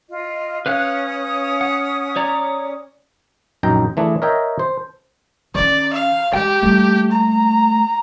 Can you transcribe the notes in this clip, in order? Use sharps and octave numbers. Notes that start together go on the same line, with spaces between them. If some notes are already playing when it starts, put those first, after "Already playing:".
F4 D#5
C#4 B4 F5 D#6 F#6
F#5
C#5 D5 A#5
A#1 F#2 D#4 G5 A#5
E3 A3 D4 G#4
A#4 C#5 D#5 E5 G5
C5
D#3 C#4 D5
F5
G#3 G4 G5
G3 A3 A#3
A#5